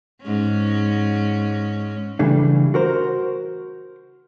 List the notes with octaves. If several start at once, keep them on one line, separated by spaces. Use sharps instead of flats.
G#2 C#4
C#3 E3 G3 A3 D4
F#4 A#4 C5